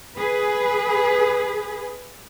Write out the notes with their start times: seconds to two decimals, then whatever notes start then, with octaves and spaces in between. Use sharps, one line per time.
0.17 G#4 B4